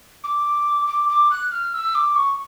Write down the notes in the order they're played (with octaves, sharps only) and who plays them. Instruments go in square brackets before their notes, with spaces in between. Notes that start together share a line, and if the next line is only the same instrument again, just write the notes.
[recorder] D6
D6
D6
F#6
F6
E6
D6
C#6